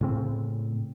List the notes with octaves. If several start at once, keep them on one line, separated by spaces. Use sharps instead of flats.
A2 C#3 C4